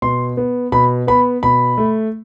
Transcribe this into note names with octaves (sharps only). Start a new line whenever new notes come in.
B2 C6
B3
B2 B5
B3 B5
B2 B5
A3